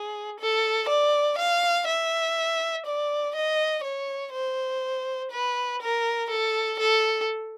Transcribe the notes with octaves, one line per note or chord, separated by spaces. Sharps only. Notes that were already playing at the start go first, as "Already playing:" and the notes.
Already playing: G#4
A4
D5
F5
E5
D5
D#5
C#5
C5
B4
A#4
A4
A4